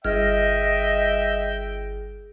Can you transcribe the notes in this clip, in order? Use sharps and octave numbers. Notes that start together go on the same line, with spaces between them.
G1 G#4 D#5 E5 G5 F6